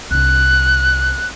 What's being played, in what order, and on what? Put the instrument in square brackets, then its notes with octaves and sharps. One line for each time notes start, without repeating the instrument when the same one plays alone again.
[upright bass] C2 D4 [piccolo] F#6